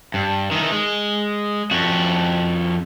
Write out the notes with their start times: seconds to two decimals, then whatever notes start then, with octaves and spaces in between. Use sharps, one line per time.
0.14 G2
0.51 D#3 E3
0.72 G#3
1.71 F2 F#4